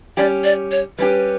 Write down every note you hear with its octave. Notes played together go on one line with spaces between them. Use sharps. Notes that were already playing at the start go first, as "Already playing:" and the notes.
G3 C#4 G4 D5
D5
C#5
G3 C#4 G4 B4